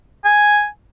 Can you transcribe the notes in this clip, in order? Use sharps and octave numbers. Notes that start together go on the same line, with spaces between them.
G#5